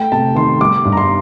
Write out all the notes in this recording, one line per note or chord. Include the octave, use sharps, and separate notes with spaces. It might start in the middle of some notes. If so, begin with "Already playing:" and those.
Already playing: A3 G5
C3 A5
D#3 C6
G3 D6
G2
A#5
C6